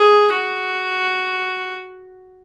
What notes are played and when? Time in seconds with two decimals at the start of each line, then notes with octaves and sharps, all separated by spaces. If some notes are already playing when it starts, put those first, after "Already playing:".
Already playing: G#4
0.32 F#4